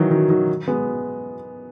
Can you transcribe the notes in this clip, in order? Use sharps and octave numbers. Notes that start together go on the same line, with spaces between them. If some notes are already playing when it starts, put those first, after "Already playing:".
Already playing: D#3 E3 F#3
D#3 F#3
D#3 F#3
G#3 B3